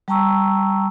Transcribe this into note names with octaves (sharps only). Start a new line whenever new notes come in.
G3 G5 A5 A#5 C#6 E6